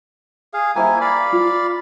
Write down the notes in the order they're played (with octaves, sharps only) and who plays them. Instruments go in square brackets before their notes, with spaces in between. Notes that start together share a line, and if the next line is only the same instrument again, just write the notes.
[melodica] G#4 F5
[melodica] A#3 E4 G#5 [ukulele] G4 C5 E5
[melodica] D5 F5 B5
[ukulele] F4